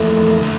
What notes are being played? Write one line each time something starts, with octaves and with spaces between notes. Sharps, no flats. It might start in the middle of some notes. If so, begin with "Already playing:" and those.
Already playing: F2 E3 A3 A#3
D3 A3